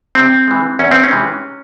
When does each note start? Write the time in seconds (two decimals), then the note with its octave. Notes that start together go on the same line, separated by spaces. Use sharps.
0.15 C3 C4
0.47 E3 G#3
0.79 E2 C#4
0.91 C4
1.03 C#4
1.11 C3 E3 G#3